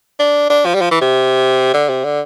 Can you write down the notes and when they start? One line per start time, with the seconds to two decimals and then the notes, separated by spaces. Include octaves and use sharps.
0.19 D4
0.50 D4
0.65 F3
0.75 G3
0.81 F3
0.91 E3
1.01 C3
1.74 D3
1.89 C3
2.04 D3